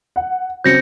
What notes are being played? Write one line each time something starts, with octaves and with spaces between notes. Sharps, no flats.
F#5
C#3 F#3 C4 G6 A#6 C#7